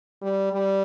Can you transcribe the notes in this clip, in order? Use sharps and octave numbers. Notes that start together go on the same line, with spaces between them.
G3
G3